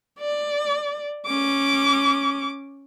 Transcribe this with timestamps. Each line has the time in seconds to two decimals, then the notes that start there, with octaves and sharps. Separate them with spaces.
0.20 D5
1.27 C#4 D6